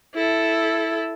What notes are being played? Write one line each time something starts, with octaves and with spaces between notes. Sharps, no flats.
E4 A4